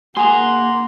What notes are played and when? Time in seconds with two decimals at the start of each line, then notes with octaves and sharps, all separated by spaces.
0.17 A#3 G#4 F#5 A#5 C6